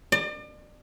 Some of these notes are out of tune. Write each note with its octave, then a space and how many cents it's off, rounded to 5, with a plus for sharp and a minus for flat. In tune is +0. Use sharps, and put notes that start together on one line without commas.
D5 +35